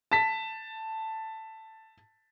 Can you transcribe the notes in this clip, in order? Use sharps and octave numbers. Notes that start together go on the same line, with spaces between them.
A5 B6